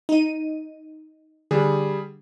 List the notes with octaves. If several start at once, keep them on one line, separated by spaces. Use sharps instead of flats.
D#4 D#7
D3 G3 G#4